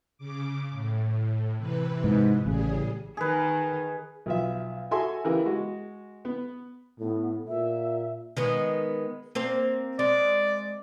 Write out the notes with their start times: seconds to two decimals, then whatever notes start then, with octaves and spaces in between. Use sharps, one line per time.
0.18 C#3 D6
0.71 A2
1.57 C3 E3 B4
2.04 G#2
2.46 A1 A2 C#3 G3 G#4
3.17 D#3 G#4 B4
4.26 B1 F3 E5
4.91 F#4 G#4 A4 E5 G#5 C6
5.24 C#3 E3 E4 G4 A#4
5.46 G#3 F#4
6.25 B3
7.00 A2 B3
7.47 A#2 E5
8.37 D#3 G#3 B3
9.35 A#3 C4 C5
9.99 G#3 D5